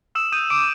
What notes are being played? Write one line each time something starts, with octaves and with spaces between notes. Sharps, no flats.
D#6 E6 E7
D#6 G6 D#7
D6 D#6 D7